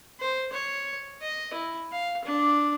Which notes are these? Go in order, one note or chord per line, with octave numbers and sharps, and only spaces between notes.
C5
C#5
D#5
E4
F5
D4